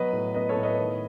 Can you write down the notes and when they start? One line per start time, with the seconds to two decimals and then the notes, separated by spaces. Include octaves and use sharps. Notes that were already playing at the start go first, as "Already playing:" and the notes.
Already playing: F#3 B3 B4 D#5
0.13 A2
0.34 B3 B4 D#5
0.49 A4 C#5
0.57 A2
0.63 B4 D#5
0.79 D#3